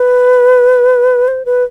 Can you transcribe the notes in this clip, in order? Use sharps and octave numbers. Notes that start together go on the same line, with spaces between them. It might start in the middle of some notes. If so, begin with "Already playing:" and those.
Already playing: B4
C5
B4